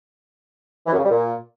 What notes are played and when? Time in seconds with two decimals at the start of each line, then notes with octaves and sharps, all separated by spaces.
0.87 E3
0.93 F#2
0.99 C#3
1.05 G3
1.10 A#2